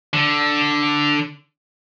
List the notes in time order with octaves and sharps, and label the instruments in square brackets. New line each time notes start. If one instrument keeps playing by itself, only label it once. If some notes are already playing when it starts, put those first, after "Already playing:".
[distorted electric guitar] D3